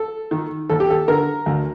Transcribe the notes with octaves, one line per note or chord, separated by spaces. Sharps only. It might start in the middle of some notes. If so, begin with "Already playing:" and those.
Already playing: A4
D#3
D#2 A4
G4
A4
D3 A#4
D2